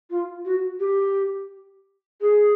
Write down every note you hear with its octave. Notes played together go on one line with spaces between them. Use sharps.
F4
F#4
G4
G#4